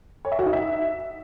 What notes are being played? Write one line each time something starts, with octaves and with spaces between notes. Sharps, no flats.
C#5
E5
F#4
D#4
E5